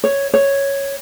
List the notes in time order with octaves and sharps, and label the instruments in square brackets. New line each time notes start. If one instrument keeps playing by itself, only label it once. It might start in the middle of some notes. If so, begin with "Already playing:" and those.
[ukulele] C#5
C#5